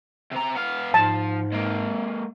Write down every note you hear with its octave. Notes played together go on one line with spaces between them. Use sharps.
C3 A#5
B3 F5
G#2 F3 A5
G#3 A#3